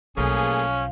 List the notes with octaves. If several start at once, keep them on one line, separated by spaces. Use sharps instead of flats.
B1 F3 A3 A#3 C#4 G#4